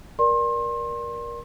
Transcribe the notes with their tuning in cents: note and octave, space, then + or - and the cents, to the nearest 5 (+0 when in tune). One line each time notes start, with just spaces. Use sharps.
A#4 +25 D5 +0 C6 +30